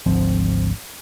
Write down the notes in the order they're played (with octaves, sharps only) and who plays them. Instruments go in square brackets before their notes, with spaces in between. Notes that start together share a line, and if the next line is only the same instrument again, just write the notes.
[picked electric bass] G#1 D2 F3 C4